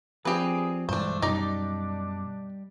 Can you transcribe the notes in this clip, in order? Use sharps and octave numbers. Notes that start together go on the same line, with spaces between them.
F3 C4 D4 G4 G#4 B4
B1 G2 E3 G#3 A3 D4 C5
F#2 B2 G3 D4 D#4 D5